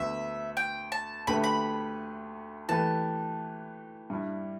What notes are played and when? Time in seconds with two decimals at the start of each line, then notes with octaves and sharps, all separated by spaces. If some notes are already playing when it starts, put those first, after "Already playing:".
Already playing: D2 D3 B3 E5
0.57 G5
0.92 A5
1.27 D2 D3 A3 G4 B4 B5
1.44 B5
2.69 E3 A3 G4 B4 A5
4.10 G2 G3 E4